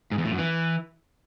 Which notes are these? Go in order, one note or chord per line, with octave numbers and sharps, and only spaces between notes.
G#2
E2
A2
F#2
E3